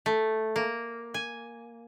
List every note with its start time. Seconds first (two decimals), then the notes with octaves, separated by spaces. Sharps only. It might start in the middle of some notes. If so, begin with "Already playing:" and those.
0.06 A3
0.56 A#3
1.14 G#5